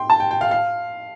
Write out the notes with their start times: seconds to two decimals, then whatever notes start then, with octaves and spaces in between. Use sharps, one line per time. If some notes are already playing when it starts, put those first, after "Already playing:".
Already playing: G5 C6
0.10 A5
0.20 G5
0.31 G5
0.41 F5
0.51 F5